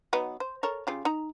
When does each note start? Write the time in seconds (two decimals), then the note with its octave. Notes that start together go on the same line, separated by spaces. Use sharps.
0.13 F#3 B3 D#4
0.40 C5
0.63 A4 A#4 C#5
0.87 C#3 F4 G4
1.05 D#4 A#5